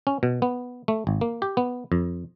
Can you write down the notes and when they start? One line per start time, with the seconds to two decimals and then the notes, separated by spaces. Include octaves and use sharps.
0.07 C#4
0.23 B2
0.42 B3
0.88 A3
1.07 G#1
1.21 A#3
1.42 G4
1.57 B3
1.92 F2